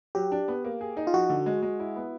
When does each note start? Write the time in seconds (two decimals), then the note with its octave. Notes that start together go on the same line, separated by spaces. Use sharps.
0.15 F#3 G4
0.32 D4
0.48 B3
0.65 A#3
0.81 G#4
0.97 D#4
1.07 F4
1.14 F3 F#4
1.29 D3
1.46 G#3
1.62 G#3
1.80 E4
1.96 B3